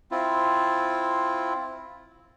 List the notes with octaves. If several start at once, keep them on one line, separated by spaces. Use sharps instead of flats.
C4 E4 F4